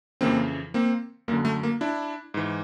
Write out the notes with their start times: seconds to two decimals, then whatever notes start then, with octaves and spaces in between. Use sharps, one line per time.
0.21 F2 C#3 E3 A#3 C4
0.74 A#3 C4
1.28 F#2 A#3
1.32 D3
1.45 A3
1.63 A#3
1.81 D4 E4
2.34 G#2 E3